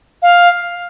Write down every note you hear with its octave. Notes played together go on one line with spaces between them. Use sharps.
F5